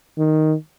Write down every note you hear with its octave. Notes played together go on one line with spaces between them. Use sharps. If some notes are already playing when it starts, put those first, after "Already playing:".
D#3